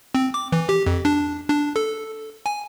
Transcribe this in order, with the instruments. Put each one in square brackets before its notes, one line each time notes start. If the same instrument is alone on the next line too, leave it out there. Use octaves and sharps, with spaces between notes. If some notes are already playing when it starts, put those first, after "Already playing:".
[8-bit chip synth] C4
D6
E3
G4
F2
D4
D4
A4
G#5